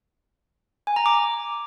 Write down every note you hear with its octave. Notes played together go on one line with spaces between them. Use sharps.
G#5
A#5
D6